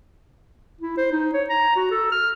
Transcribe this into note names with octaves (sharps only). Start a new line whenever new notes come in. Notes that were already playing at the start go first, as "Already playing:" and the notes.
E4
C5
D#4
C#5
A#5
F#4
A4
F6